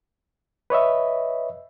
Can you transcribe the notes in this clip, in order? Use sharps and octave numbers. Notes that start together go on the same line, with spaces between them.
B4 C#5 D#5 E5